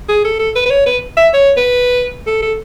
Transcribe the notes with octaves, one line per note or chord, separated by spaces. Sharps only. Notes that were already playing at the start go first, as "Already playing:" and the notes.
G#4
A4
A4
B4
B4
C#5
B4
E5
C#5
B4
A4
A4